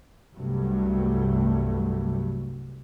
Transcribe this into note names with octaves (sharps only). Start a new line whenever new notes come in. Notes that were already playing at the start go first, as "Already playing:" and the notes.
C2 G2 F#3 G3 A3